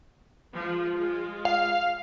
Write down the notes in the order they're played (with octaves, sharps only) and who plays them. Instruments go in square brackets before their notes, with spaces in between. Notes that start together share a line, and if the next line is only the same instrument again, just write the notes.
[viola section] F3 G#3 F4
G#3 F4
[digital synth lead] F5